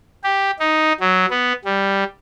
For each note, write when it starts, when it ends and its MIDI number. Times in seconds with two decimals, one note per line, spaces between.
0.24 0.51 67
0.59 0.93 63
1.01 1.26 54
1.30 1.53 59
1.65 2.04 55